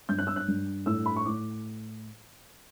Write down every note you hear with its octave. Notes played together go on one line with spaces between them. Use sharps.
G2 G6
F#6
E6
F#6
G2
A2 E6
B5
C#6
A2 D6